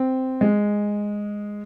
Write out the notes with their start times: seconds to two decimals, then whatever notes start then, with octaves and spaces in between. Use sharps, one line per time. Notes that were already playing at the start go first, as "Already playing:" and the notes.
Already playing: C4
0.41 G#3